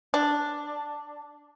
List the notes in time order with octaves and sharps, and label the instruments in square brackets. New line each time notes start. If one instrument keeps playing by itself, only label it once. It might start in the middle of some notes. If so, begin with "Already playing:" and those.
[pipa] D4